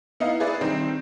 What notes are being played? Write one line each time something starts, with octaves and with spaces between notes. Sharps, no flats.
B3 D#4 E4 D#5 F5
G#4 B4 D5 E5
D#3 G3 C4 D4 D#4